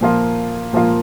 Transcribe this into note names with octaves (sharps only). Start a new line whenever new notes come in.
A#2 F3 A#3 F4
A#2 F3 A#3 F4